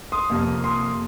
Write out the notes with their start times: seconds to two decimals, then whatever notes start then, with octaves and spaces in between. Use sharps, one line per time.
0.12 C6 D#6
0.30 F2 C3 F3 A#3
0.64 C6 D#6